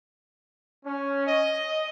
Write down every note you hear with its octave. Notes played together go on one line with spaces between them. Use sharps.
C#4
D#5